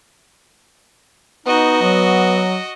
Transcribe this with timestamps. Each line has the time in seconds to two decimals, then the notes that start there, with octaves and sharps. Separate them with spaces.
1.47 B3 D#4 F#4 D#5
1.82 F#3